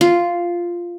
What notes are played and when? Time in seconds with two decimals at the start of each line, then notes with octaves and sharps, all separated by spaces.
0.01 F4